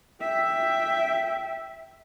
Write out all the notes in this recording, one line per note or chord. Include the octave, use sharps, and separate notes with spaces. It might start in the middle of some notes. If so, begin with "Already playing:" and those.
E5 G5